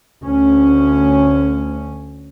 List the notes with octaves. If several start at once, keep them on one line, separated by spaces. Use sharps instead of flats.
D2 C#4